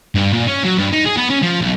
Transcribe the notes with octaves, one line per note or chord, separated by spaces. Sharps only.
G2
A#2
C#4
F#3
G2
D#4
G#4
B3
C#4
F3
B1